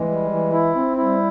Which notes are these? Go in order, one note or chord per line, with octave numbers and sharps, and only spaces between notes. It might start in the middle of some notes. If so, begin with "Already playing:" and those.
Already playing: E3 G#3
G3
E3
E4
C4
G3 E4